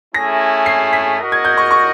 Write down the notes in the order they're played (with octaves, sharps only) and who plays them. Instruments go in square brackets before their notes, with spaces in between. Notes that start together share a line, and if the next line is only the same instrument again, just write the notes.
[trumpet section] A3 C#4 E4 G#4 [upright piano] A#6
[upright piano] C7
B6
[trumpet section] F#4 A#4 D#5
[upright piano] G#6
G6
C#6
C#6